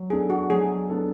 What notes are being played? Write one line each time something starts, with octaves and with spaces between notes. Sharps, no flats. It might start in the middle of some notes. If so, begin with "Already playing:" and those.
Already playing: F#3
B3 D4 G#4 A4
F#4
F#3 G#4
B3 D4 A4